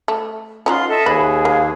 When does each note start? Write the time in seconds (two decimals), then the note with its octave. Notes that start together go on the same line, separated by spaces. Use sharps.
0.08 A3
0.66 C#4 D#4 F4 F#4 C6
0.88 A4 D#5 E5
1.06 D#2 G#4 B4
1.45 A#3